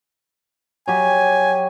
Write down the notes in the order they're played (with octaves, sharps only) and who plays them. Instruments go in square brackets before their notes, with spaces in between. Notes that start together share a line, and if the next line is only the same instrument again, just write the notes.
[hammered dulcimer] F#3 G4 [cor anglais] G#5